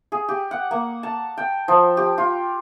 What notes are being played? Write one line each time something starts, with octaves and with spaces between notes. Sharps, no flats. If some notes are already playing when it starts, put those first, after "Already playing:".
G#4
G4
F#5
A#3
A5
G5
F3
G4
F4